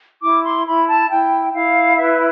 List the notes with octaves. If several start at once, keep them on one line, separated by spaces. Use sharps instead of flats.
E4 D6
C6
E4 B5
A5
E4 G5
E4 F5
B4 E5